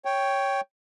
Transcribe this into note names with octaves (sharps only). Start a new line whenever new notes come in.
C#5 G5